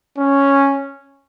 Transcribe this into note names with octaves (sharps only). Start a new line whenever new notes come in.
C#4